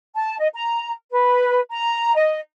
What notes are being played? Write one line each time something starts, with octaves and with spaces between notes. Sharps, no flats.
A5
D#5
A#5
B4
A#5
D#5